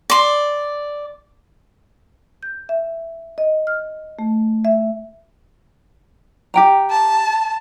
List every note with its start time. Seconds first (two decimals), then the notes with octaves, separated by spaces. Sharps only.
0.10 D5 C6
2.43 G6
2.69 E5
3.38 D#5
3.67 F6
4.19 A3
4.65 E5
6.54 G4 G5 A#5
6.91 A5